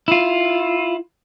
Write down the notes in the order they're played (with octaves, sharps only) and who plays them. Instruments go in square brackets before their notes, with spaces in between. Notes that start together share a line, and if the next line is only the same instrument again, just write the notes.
[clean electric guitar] E4 F4